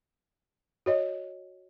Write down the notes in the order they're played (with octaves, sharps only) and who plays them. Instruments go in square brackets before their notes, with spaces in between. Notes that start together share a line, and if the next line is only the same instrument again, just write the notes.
[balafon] F#4 C#5 D#5